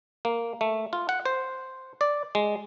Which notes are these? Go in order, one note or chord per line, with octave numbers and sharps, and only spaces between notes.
A#3
A3
F4
F#5
C5
D5
G#3